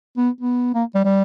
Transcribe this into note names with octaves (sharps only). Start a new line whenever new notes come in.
B3
B3
A#3
G3
G3